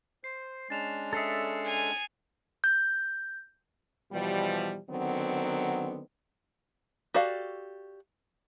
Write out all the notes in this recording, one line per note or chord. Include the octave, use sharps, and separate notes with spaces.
C5 C7
G#3 C#4 D4 A6 E7 F7
A4 E5 D#6 C7 C#7
G#5 C7 F7
G6
B2 E3 F3 G3
D3 D#3 F#3 B3 C4
F#4 G4 A4 D5 F5